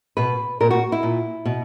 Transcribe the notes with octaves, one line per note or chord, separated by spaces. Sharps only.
B2 B4
A#2 A#4
F#4
E4
A#2
B2